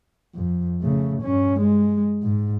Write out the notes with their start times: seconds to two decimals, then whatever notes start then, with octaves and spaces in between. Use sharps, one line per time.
0.35 F2
0.81 C#3 A3
1.22 G2 C#4
1.60 G#3
2.22 G#2